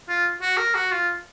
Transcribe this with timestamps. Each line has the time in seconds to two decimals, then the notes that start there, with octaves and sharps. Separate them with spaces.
0.09 F4
0.42 F#4
0.57 A#4
0.75 F#4
0.91 F4